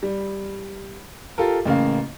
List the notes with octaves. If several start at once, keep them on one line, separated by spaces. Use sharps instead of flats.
G3
F4 G4 A4 A#4
A1 C#3 A#3 F5